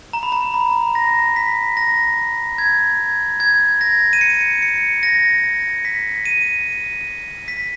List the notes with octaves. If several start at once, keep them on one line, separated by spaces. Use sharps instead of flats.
A#5
B5
A#5
B5
A#6
B6
A#6
G#6
G#6
A#6
D#7
C#7
C#7
A#6
B6
D#7
B6